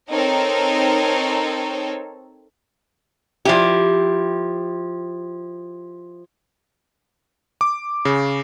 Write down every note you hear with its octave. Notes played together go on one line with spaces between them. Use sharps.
C4 D#4 A4 A#4 C#5
F3 E4 G4
D6
C#3